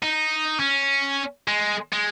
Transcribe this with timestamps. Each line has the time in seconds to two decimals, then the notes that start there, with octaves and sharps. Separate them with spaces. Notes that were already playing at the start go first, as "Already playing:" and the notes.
0.03 D#4
0.60 C#4
1.48 G#3
1.93 G#3